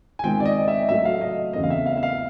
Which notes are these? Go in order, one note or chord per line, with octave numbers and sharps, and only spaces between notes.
G#5
D#3 G#3 C4 F4 G5
D5
D#5
E5
A2 F#3 A3 E5
F5
D#5
E2 C#3 E3 A3 C4 D#5
F5
E5
F5
E5
F5